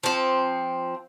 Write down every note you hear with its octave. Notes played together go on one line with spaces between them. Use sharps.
F3 C4